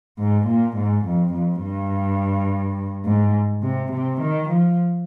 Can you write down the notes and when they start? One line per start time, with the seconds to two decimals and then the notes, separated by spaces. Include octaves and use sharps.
0.19 G#2
0.47 A#2
0.77 G#2
1.06 F2
1.34 F2
1.63 G2
3.05 G#2
3.63 C3
3.92 C3
4.21 D#3
4.49 F3